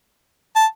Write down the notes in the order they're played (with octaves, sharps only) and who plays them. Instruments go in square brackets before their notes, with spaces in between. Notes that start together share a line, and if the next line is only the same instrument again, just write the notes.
[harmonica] A5